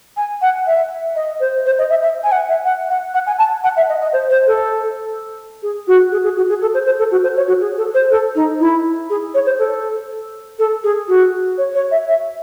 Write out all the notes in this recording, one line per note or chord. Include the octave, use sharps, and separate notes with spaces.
G#5
F#5
E5
D#5
C5
C5
D#5
E5
E5
G#5
F#5
E5
F#5
F#5
F#5
G#5
A5
F#5
E5
D#5
D#5
C5
C5
A4
G#4
F#4
G#4
G#4
F#4
G#4
A4
C5
C5
A4
F#4
C5
C#5
F#4
G#4
A4
C5
A4
D#4
E4
G#4
C#5
C5
A4
A4
G#4
F#4
C#5
C#5
E5
E5